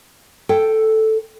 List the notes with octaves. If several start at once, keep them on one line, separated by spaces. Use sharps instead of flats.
A4 G5